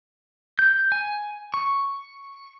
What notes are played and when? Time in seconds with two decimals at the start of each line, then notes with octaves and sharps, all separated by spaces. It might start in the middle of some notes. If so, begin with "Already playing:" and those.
0.59 G6
0.92 G#5
1.54 C#6